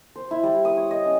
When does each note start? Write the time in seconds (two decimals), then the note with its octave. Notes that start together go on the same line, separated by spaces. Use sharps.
0.16 C5
0.31 E4
0.43 G3
0.65 D#6
0.77 C#5
0.91 D#5
1.05 C#4